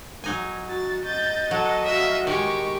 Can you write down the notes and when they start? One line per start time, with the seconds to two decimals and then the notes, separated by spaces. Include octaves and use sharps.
0.24 F#3 D#4 G#5
0.69 F#4 A6
1.05 D#5 G6 A6
1.51 F#3 A4 F#5
1.85 F#4 E5 F5
2.27 D#3 G#3 G4 C#6